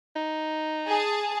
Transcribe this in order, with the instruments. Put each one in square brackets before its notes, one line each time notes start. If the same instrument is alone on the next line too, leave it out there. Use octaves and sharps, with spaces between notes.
[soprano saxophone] D#4
[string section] G#4 A5